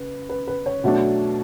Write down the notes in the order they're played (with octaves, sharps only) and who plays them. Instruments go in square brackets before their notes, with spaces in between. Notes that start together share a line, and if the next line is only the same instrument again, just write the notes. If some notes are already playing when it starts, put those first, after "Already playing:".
Already playing: [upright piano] C#3 B4
B4
B4
C#5
B2 F#3 A3 D4